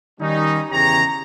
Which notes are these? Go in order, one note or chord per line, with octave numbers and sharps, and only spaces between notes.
D#3 G3 C#4 D#4
E2 C#3 E3 G4 C#5 A#5